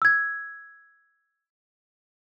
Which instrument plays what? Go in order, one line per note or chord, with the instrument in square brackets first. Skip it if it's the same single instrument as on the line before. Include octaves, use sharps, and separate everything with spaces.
[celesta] E6 G#6